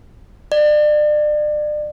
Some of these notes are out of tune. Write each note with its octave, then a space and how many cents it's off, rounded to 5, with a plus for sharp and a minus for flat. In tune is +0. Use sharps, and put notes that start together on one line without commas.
D5 +35